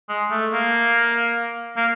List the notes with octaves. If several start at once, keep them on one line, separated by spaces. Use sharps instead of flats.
G#3
A3
A#3
A#3